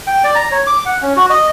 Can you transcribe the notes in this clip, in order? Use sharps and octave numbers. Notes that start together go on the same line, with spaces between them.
G5
D5
A#5
C#5
D6
F#5
C#4
F#4
D#5